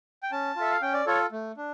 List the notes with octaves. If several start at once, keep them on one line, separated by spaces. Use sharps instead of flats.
G5
C#4 A5
F4 A4 E5
F5
C#4 G5
D5
F4 A4 C#5
A3
D4